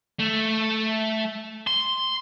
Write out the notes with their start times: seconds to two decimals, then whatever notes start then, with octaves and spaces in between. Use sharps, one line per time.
0.20 A3
1.67 C6